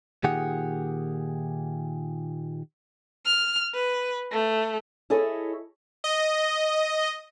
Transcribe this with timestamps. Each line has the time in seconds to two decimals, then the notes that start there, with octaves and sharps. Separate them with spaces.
0.24 A#2 D#3 G4 G#4 F#5
3.25 F6
3.74 B4
4.31 A3
5.10 E4 G#4 A4 C#5 D#5 E5
6.04 D#5